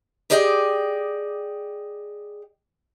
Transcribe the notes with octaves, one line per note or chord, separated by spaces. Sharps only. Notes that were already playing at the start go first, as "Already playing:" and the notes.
G4 G#4 D5 D#5 F#5 G5